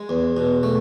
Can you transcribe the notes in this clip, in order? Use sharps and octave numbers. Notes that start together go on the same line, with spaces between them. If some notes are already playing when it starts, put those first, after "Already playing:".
Already playing: G#3
E2
B2
A3